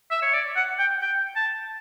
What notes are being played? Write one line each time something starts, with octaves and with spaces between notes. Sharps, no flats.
E5
C#5
D5
F#5
G5
G5
A5